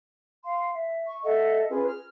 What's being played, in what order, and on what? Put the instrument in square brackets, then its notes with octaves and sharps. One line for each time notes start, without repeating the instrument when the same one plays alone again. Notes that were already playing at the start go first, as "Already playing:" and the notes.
[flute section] F5 C6
E5
C#6
A4 D#5 E5 F#5
C#4 F4 G#4 B4
F6